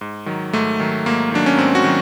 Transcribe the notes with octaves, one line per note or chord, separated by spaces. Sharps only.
G#2
D#3 F#3
G#2 A3
D#3 F#3
G#2 A#3
D#3 F#3 D4
C#4
G#2 C4
F#4
D#3 F#3